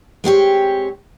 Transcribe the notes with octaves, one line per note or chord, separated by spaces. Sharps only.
G#3 C4 G4 C#5